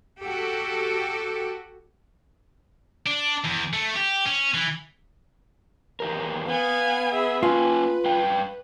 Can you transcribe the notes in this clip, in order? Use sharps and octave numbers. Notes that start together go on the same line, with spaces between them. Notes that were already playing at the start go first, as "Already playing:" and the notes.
F#4 G4 A4
D4
E2
A3
G4
C#4
E3
E2 G4 A#4
B3 F5 G#5
G#4 E5
A#3 C#4 F4 B4 G#5
G2 F5 G5